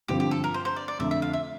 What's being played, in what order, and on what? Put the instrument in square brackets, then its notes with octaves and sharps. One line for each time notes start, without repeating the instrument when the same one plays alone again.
[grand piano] G2 D3 F3 C4 [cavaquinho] G4
[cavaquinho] G4
A4
A#4
C5
C5
D5
D5
[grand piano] F2 D3 A3 [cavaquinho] E5
[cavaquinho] E5
F5
E5